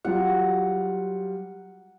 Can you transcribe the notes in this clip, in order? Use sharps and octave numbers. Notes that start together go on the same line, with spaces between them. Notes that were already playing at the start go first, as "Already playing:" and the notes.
F#3 G3 F4 F#5